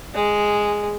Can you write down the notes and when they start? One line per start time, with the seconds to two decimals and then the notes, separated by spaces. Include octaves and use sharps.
0.14 G#3